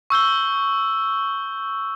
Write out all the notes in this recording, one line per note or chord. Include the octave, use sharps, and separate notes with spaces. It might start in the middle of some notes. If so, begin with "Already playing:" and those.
C#6 E6 G6 G7